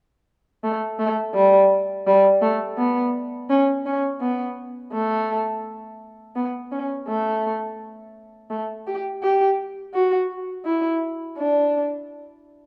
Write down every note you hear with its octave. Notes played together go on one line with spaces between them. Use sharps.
A3
A3
G3
G3
A3
B3
C#4
C#4
B3
A3
B3
C#4
A3
A3
G4
G4
F#4
E4
D4